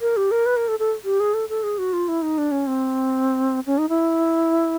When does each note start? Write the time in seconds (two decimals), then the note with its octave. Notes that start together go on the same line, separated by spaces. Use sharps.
0.01 A#4
0.17 G4
0.31 A#4
0.46 B4
0.57 A#4
0.68 A4
0.79 A4
1.05 G4
1.20 G#4
1.34 A4
1.49 A4
1.63 G#4
1.78 F#4
1.93 F4
2.08 E4
2.22 D#4
2.38 D4
2.52 C#4
2.67 C4
3.66 C#4
3.78 D#4
3.89 E4